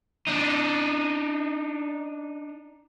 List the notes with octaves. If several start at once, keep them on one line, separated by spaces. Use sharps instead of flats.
D4 D#4